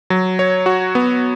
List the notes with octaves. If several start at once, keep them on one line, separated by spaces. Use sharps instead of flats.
F#3
C#5
F#4
B3